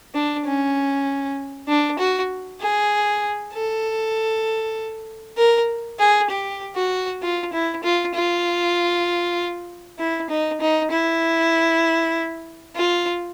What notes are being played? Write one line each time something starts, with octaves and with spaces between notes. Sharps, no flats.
D4
C#4
D4
F#4
G#4
A4
A#4
G#4
G4
F#4
F4
E4
F4
F4
E4
D#4
D#4
E4
F4